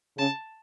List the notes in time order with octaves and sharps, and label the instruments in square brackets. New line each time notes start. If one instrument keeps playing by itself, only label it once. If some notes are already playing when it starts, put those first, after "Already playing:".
[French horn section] C#3 [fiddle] A5